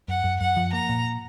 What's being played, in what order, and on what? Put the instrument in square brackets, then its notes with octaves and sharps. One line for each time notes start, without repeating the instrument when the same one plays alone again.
[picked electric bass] F#2 [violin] F#5
[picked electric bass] F#2
[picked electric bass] F#2 [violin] F#5
[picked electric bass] F3
[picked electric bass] A#3 [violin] A#5
[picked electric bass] A#2